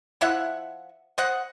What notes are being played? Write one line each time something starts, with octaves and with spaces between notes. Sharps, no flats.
F3 E4 E5 F#5
C5 D#5 F#5